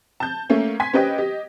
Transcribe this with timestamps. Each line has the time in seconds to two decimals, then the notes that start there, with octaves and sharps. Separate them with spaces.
0.20 A5 G6
0.50 A3 A#3 C#4
0.80 G#5 C6 G#6 B6
0.93 C#4 G4 B4 C5 D#5 G5
1.18 G4 D#5